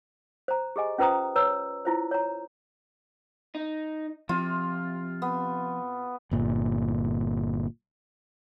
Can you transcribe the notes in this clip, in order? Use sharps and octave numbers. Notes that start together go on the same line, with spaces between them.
C5 A#5
G4 G#4 D#5 G#5
C#4 F4 B4 C5 A#5 D#6
B4 C#5 A#5 E6
E4 F4 C5
C#5 A#5
D#4
C3 F3 F4
B3
G1 A#2